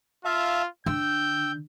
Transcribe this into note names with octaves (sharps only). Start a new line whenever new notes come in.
F4 E5 F5 A5
D3 G5 E6 G6